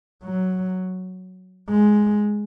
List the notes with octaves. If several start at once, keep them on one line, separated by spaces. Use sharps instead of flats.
F#3
G#3